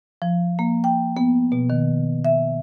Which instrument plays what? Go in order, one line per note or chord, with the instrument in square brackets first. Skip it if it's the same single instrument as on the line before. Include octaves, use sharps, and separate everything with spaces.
[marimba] F3
A#3
G5
B3
B2
D#3
E5